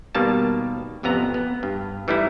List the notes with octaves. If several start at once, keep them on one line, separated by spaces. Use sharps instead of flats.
B2 D#3 G3 A#3 A5
A1 F2 C3 B3 A#5
B3
G2
E3 G3 A3 D#4 E4